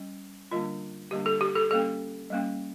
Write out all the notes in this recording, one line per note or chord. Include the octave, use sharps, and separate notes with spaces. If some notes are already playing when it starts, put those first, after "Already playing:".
Already playing: G3 C#4
D3 G3 A#3 D4 F4
D3 G3 A#3 D4 G4
A4
G4
A4
G3 A#3 C#4 A4
G3 A#3 C#4